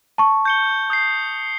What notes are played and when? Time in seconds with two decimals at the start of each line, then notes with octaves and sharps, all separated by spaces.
0.18 A5 C#6
0.45 G6 C#7 G7
0.90 D#6 G6 C7